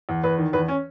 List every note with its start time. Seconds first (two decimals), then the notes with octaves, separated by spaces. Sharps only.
0.09 E2
0.23 E2 B4
0.38 D#3
0.53 E2 B4
0.68 C#4